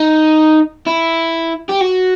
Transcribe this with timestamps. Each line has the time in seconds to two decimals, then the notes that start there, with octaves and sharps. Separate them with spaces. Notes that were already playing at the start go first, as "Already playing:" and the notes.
Already playing: D#4
0.86 E4
1.69 G4
1.81 F#4